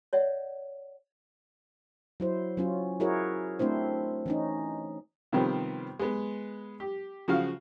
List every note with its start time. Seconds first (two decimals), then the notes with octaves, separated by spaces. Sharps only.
0.13 C#5 D5 E5 F#5
2.20 F#3 E4 C5
2.57 F#3 C#4 F4
3.00 E4 F#4 G#4 A#4 C#5
3.59 A3 C4 D4 E4 C5
4.26 E3 C#4 D#4
5.32 C3 D#3 F3 G3 B3 C4
5.99 G#3 B3
6.80 G4
7.28 C#3 F3 F#4 F5